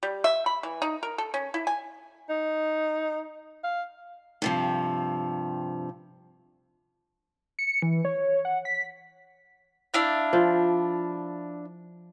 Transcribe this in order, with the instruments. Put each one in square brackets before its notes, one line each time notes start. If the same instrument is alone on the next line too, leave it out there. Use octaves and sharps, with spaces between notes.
[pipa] G3
E5
B5
E3
D#4
A#4
A4
C#4
E4
G#5
[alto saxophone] D#4
F5
[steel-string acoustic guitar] G2 C3 F3
[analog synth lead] C#7
E3
C#5
F#5
B6
[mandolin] D4 E4 F5
[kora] F3